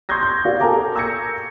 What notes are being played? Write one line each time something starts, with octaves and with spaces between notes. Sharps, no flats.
C6 C#6 D#6 G6 G#6 A#6
G6
F#4 G4 A#4 D5 F5
A4 A#4 G5 G#5 A#5 D6
C#6 E6 G6 G#6 A#6 C#7